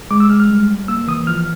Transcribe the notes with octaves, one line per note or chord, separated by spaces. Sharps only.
G#3 D6
E6
G#3 F6
F6
G3
G3
A#3 E6
E3 D#6
F3 F6